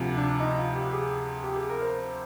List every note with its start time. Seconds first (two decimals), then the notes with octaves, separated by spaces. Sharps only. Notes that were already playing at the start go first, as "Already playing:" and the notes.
Already playing: D2 C3 F3
0.17 D4
0.40 D#4
0.58 F4
0.75 G4
0.89 G4
0.93 G#4
1.43 G4
1.56 G#4
1.69 A#4
1.82 C5